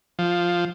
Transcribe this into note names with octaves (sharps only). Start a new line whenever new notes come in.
F3